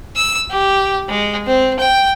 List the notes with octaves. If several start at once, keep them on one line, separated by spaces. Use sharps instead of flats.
E6
G4
G#3
C4
G5